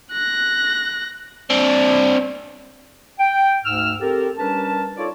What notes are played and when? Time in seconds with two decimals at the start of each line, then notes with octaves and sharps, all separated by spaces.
0.11 F#6 A#6
1.50 C4 D4
3.20 G5
3.65 D2 G#2 E6 F6
4.01 C4 G4 A4 A#4
4.38 G3 C#4 D4 A#4 B4 A5
4.97 D#4 F4 A4 C#5 D5